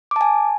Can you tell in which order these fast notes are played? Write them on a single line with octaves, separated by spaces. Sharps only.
D6 A5 G#5